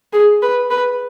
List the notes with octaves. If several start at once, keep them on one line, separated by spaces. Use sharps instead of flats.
G#4
B4
B4